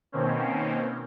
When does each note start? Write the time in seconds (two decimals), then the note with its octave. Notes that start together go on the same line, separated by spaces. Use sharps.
0.12 B2 D#3 A#3 C4 C#4